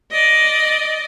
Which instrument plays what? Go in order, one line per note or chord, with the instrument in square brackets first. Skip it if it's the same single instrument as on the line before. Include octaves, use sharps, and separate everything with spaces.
[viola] D5 D#5